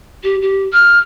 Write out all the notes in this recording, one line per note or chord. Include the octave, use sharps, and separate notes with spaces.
G4
G4
F6